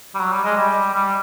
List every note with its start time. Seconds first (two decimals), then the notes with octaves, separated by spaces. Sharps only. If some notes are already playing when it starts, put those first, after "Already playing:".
0.15 G3
0.20 F#3
0.32 G3
0.44 G#3
0.57 G3
0.94 G3